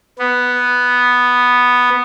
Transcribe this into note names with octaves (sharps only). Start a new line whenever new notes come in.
B3